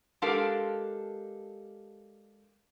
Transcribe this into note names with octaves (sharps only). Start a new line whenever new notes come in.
G#3 D4 G4 A4 A#4 F5